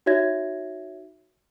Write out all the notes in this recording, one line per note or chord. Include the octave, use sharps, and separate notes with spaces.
D#4 F#4 C#5 E5 G#6 A#6